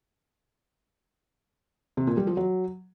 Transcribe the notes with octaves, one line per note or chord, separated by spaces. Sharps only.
C3
A#2
G3
F3
F#3